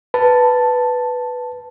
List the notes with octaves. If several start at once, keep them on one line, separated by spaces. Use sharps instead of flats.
B4 A5